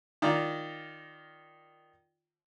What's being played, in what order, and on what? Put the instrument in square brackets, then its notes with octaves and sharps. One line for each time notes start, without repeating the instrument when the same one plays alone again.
[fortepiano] D#3 F4 D5 A#5